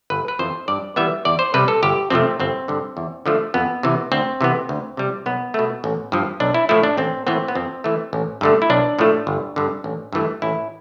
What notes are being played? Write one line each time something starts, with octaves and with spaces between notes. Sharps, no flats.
G1 B4
B4
F2 E3 C5
G2 D5
E3 G3 B3 E5
E2 D5
C5
C3 G3 B4
A4
G1 G4
F2 C3 F3 A3 C4
G1 C4
G2 D3
E2
D3 F3 A3
F2 B3
C3 E3
D2 C4
C3 E3 B3
D2
C3 G3
B1 B3
B2 A3
A1
G2 F3
B1 D4
E4
A2 F3 A3 E4
D4
A1 C4
A2 E3 B3 C4
B3
F2 C4
E3 A3
A1
G2 D3 A3
E4
B1 D4
A2 F3 A3
G1
G2 D3
A1
G2 E3 A3
A1 E4